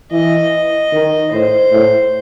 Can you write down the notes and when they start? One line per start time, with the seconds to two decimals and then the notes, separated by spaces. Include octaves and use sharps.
0.11 E3 D#5
0.92 D#3
1.32 A2 C5
1.72 A2